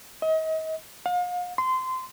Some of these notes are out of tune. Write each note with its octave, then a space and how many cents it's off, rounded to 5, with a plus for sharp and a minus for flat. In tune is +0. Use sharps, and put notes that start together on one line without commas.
D#5 +35
F5 +40
C6 -20